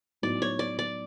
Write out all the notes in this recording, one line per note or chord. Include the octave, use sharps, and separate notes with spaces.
A2 F#3 B3 D#4 D5
C#5
D5
D5